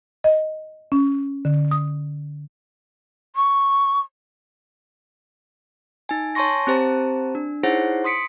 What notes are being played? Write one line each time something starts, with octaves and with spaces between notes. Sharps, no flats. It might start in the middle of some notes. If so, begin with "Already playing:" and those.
D#5
C#4
D3
D#6
C#6
D#4 G#5
C#5 G#5 A5 C6 C#6 A#6
C4 G4 C5 A5 A#5
D4
D#4 E4 G#4 C5 C#5 F#5
C6 D#6 B6 C#7 D7